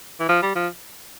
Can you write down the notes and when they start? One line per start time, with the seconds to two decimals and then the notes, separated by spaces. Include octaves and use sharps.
0.20 E3
0.28 F3
0.42 G3
0.55 F3